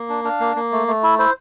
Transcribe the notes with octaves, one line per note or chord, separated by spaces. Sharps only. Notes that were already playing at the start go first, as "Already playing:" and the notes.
Already playing: A#3
D4
D4 F5
A#3
A#3
A3
A3
E4
E4 C5